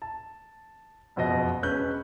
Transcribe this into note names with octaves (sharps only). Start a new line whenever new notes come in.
A5
F#1 F2 B2 D#5 A#6
E1 C#4 B4 F#6 G6